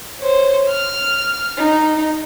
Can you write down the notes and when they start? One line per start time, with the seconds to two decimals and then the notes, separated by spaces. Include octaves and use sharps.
0.20 C5 C#5
0.69 F6
1.58 D#4